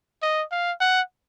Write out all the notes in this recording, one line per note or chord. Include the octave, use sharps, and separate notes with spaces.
D#5
F5
F#5